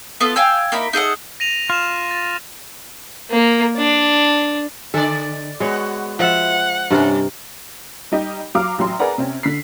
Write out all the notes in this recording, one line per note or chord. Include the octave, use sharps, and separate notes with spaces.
B3 F4 A4
F5 G5 G#5 E6
A#3 D#4 E4 B5
D#4 G#4 A4 F#5
A#6 D#7 F7
F4 F6 E7
A6
A#3
D4
D3 A4 D5
G#3 B3 F#4 C#5
F3 E5 F#5
G2 C3 G3 C#4 A#4
G3 D#4 G4
F#3 F5 D6 F6
A1 F#3 C6
G#4 A#4 B4 D5 F#5 A#5
C3 C4 C#4
D3 B6 C7